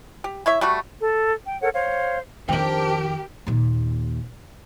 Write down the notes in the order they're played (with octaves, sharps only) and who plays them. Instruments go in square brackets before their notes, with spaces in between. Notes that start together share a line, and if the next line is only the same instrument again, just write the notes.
[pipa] G4
E4 C#5 E5
G3 A3 F#4
[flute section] A4
G5
A4 A#4 C#5 F#5
C5 C#5 F5
[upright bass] F2 D#3 [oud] C4 D4 [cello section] G4 A#4 [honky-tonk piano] G5
[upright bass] D#2 A#2